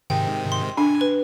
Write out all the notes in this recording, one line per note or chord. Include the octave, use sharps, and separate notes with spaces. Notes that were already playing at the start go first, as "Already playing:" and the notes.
G#2 C3 D#3 G5
C6
D4 G#5
B4